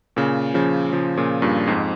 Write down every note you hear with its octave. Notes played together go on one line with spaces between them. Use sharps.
A#2 C#3
C#3 F3
C#3 F3
A#2 C#3
G2 A#2
F2 G#2